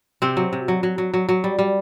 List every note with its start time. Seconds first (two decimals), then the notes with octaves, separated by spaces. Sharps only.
0.22 C3 C4
0.37 F#3
0.53 C3
0.68 F#3
0.83 F#3
0.98 F#3
1.14 F#3
1.29 F#3
1.44 G3
1.59 G3